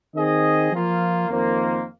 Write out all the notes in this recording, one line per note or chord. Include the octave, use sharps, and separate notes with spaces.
D#3 C4 G#4 D#5
F3 A#3 F4
F2 D#3 A#3 F4 C5